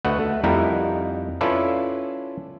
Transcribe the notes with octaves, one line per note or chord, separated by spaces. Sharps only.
D2 A3 F#4 B4 D#5 F#5
A3
F2 G3 D#4 E4 A#4 F#5
C#4 E4 F4 A4 B4 D5